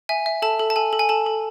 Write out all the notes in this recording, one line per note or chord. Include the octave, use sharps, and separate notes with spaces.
E5 G#5
E5
A4 A5
A4
A5
A4 G#5
A4
G#5
A4 A5
A4